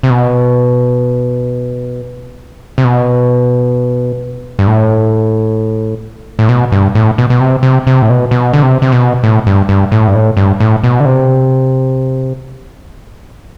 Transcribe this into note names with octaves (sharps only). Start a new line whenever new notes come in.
C3
B2
C3
B2
G2
A2
A2
B2
G2
A2
B2
B2
C3
C3
C3
A2
B2
B2
D3
C3
C3
B2
A2
G2
G2
A2
G2
A2
G2
A2
B2
D3
C3